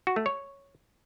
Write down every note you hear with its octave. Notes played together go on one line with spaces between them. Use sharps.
F#4
A3
C#5